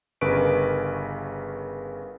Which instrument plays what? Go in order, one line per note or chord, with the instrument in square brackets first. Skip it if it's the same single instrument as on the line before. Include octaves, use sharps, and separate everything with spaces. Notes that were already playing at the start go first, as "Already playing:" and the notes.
[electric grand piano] G1 C#3 A#4 B4 C#6 D7